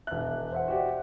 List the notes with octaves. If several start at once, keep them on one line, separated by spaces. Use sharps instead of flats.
E1 E5 F#6
C5 E5 F#5
F#4 G4 D5